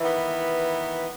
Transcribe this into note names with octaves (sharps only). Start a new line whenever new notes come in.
D#3 E3 B3